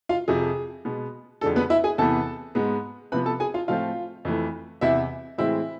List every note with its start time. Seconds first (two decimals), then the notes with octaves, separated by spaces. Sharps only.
0.09 F4 F5
0.28 F2 C3 F3 G#4
0.85 B2 G#3 B3
1.41 F2 D3 G#3 A4
1.56 B3 B4
1.70 E4 E5
1.84 G#4 G#5
1.98 E2 C3 E3 B3 A4 A5
2.55 G#2 G#3 B3
3.12 C3 F3 B3 B4 B5
3.26 A4 A5
3.40 G#4 G#5
3.54 F4 F5
3.68 A2 F3 A3 C4 F4 F5
4.25 F2 E3 A3
4.81 E2 C3 E3 E4 E5
5.38 A2 E3 G#3 C4 E4 E5